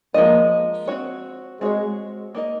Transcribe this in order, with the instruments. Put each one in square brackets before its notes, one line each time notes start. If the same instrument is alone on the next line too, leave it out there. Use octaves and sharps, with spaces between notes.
[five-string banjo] F3 G#3 D#4 A#4 D#5 [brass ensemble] A#3
[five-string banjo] C4 F#4 C#5
[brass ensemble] G#3 [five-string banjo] C4 F#4 C#5
[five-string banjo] A#3 D#4 A#4 D#5